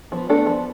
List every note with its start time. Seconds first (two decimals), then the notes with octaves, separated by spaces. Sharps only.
0.12 F3 B3
0.29 A3 D4 A4
0.46 F3